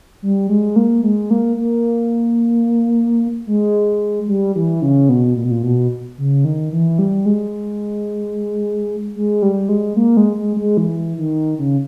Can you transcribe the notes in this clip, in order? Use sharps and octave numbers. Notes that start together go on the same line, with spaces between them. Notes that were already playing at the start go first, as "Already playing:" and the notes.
G3
G#3
A#3
G#3
A#3
A#3
G#3
G3
E3
C#3
B2
A#2
B2
A#2
B2
C#3
D#3
E3
G3
G#3
G#3
G3
G#3
A#3
G#3
G#3
G#3
E3
D#3
C#3